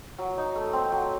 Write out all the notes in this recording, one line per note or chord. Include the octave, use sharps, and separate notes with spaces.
F#3
D#4
A3
C4
F#3